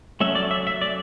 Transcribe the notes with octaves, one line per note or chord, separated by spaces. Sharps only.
F#3 A3 C#4 E5
D5
E5
E5
D5